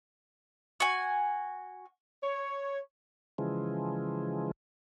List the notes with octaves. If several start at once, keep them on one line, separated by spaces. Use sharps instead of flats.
F#4 G#5
C#5
C#3 E3 F3 G#3